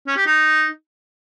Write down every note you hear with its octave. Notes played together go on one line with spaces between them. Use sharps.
C#4
G4
D#4